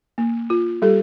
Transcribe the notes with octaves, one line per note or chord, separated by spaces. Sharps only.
A#3
F4
G3 G4 A4